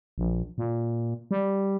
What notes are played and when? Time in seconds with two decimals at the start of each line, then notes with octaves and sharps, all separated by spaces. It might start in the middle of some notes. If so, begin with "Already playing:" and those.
0.18 A#1
0.58 A#2
1.31 G3